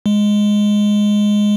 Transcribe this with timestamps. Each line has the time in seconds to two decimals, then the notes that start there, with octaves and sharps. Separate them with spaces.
0.06 G#3